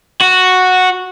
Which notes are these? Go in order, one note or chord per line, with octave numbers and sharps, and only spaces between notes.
F#4